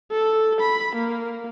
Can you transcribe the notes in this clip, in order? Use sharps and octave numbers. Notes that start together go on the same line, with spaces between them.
A4
B5
A#3